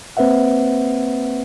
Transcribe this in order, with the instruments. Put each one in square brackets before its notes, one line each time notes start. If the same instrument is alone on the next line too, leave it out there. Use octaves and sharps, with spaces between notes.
[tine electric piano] A#3 C4 B4 C5 E5 F#5